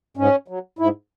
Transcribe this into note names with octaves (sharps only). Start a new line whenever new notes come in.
G#2 C#4
F#3
G#2 E4